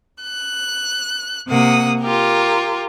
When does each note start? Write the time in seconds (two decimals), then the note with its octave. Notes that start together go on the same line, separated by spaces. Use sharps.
0.22 F#6
1.48 C3 A#3 F#5 D#6
2.01 F4 G4 A#4